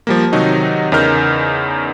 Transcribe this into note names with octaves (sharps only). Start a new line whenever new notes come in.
F3 G3 A#3
C3 D#3 F#3 D#4 F#4
E2 C#3 D#4 A#4 F6 G6